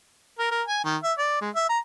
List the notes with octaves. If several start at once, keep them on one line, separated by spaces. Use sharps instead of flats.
A#4
A#4
G#5
D#3
E5
D5
G#3
E5
A#5